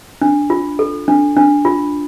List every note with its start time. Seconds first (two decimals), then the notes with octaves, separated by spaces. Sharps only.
0.22 D4
0.50 F4
0.79 A4
1.08 D4
1.37 D4
1.65 F4